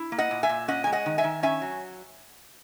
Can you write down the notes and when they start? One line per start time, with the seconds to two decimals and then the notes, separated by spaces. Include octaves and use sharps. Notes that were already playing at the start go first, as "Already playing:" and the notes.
Already playing: E4
0.12 A#3
0.18 D#5 F#5
0.31 A#2
0.43 E5 G#5
0.49 A#2
0.68 C#4 D#5 F#5
0.84 G#3 G#5
0.92 D#5 F#5
1.06 D#3
1.18 E5 G#5
1.24 D#3
1.43 C#4 E5 G#5
1.62 F#3